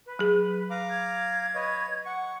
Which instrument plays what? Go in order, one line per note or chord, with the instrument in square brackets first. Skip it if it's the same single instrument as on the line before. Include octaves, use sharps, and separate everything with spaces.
[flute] B4
[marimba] F#3 G#4
[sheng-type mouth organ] F5 A#5 D6
[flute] G#6
[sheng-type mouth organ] B4 C#5 D#5
[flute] F#5 [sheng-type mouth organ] C#6